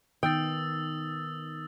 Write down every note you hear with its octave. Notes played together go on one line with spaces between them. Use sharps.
D#3 B3 D#4 G5 D#6 E6 A6